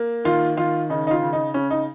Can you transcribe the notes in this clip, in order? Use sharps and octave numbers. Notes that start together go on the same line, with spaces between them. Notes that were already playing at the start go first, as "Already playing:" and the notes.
Already playing: A#3
D#3 F4
D#3 F4
C#3 D#4
D#4
F4
C#3
D#4
C#3 C#4
D#4